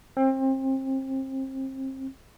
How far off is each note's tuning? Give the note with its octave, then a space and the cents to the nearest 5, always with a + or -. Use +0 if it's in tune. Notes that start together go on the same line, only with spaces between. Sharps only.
C4 +30